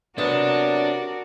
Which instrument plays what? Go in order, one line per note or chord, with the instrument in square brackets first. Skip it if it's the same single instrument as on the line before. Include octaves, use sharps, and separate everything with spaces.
[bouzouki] C3 F#3 B3 [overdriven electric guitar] D4 [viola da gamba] F#4 A#4 D5